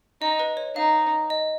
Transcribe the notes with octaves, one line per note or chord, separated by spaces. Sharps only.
D#4 D#5
B4
C#5
D#4 F5
D#5